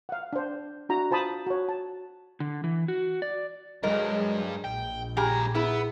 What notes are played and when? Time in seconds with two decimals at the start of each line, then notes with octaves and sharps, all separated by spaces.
0.09 F5 F#5
0.33 D4 C5
0.89 D4 E4 F#4 A#5
1.11 F4 C5 A5 B5 D#6
1.46 F#4 C#5
1.69 A5
2.40 D3
2.64 E3
2.88 F#4
3.22 D5
3.83 D2 G2 F#3 G#3 A#4 D#5
4.65 A#1 G5
5.17 G2 C#3 G4 G#4 A#5
5.55 B3 E4 G#4